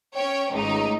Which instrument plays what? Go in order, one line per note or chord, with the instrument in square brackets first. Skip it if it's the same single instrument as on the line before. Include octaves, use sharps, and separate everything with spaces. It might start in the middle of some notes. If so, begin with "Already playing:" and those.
[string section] C#4 C#5 G5
G#1 C#2 A3 D#4